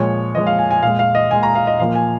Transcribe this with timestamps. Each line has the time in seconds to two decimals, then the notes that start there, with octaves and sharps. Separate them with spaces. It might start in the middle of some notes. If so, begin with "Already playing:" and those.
Already playing: A#2 F3 G#3 C#5
0.35 A#2 F3 G#3 D#5
0.47 F5
0.59 G#5
0.71 G#5
0.83 A#2 G#3 F5
0.99 F5
1.15 D#5
1.31 A#2 G#3 G#5
1.43 A#5
1.55 F5
1.67 D#5
1.79 A#2 F3 A#3 F5
1.95 G#5